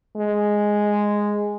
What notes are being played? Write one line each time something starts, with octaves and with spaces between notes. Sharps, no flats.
G#3